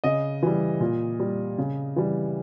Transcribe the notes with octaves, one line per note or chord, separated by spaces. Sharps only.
C#3 D#5
E3 G3
A#2
G3
C#3
E3 G3